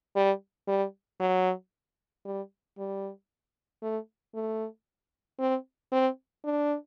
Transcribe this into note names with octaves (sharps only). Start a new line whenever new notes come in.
G3
G3
F#3
G3
G3
A3
A3
C4
C4
D4